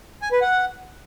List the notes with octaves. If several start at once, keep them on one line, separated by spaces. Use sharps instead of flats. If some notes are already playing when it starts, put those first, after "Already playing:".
G#5
B4
F#5